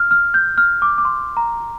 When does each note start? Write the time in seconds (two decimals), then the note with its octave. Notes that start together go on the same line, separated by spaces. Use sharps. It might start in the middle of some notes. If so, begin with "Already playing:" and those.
Already playing: F6
0.11 F6
0.34 G6
0.58 F6
0.82 D6
0.98 D6
1.05 C6
1.37 A#5